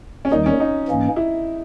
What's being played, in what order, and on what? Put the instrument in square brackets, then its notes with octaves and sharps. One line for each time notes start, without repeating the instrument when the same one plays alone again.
[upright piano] C#4
[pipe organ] D#2 D#3 G3 [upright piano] D#4
[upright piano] C#4
D#4
[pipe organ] G#2 E3 A#3 C#4
[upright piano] E4